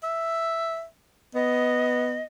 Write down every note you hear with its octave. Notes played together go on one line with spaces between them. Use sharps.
E5
B3 D#5